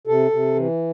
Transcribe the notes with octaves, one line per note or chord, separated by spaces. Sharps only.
C3 A4
C3
E3